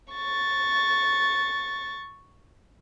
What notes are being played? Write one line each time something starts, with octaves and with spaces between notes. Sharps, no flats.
C#6 A6